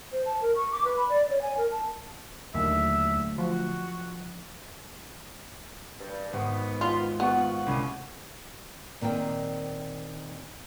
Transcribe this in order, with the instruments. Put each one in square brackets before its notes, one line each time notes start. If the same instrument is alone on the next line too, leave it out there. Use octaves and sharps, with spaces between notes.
[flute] C5
A5
A#4
C#6
D6
B4
B5
D5
C#5
G#5
A#4
A5
[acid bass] D#2 [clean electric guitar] D3 F#3 A3 [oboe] E5
[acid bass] F3 [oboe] F#4
[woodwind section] G2
[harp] G#1 [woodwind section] B3
[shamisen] F4
[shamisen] B3 [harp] F4 C#6 [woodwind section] F#5
[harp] C2 C#4 D#7
[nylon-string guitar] A#2 D#3 C4 G5